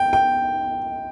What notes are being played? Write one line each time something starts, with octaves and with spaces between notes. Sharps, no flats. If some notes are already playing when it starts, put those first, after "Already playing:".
Already playing: G5
G5